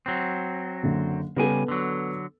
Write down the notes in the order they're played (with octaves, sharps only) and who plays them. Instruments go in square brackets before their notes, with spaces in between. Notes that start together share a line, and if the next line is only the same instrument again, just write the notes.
[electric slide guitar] F#3 C4
[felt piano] F#1 D3
[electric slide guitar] C#3 G3 G#5 [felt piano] B3 A4
[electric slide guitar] D3 F#3